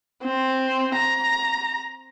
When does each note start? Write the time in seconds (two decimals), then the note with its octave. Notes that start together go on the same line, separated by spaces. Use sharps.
0.24 C4
0.95 A#5